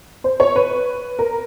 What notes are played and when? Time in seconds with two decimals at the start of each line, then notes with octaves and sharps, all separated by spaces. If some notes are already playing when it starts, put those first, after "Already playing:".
0.24 C5
0.40 C#5
0.56 B4
1.19 A#4